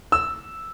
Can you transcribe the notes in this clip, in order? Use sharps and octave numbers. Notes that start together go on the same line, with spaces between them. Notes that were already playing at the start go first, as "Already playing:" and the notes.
E6